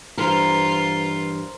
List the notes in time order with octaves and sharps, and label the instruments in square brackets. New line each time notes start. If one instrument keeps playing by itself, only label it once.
[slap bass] G2 [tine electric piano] E3 [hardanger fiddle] F4 [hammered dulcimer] A#4 C5